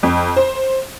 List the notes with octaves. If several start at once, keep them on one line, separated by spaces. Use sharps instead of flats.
F2
C5